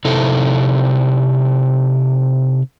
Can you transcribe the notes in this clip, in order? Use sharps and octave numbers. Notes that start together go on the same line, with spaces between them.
C3 D#4 E4 A4